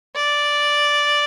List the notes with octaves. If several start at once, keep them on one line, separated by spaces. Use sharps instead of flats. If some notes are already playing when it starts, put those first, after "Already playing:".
D5